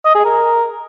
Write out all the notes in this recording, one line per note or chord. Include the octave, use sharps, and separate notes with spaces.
D#5
G#4
A#4